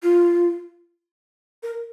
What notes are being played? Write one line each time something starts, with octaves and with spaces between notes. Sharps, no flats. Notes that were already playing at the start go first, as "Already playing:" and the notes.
F4
A#4